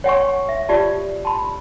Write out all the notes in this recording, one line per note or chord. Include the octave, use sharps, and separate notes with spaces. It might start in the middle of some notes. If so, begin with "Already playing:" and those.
C#5 F#5 G#5 C#6
E5
F4 G4 D5 A5
A5 B5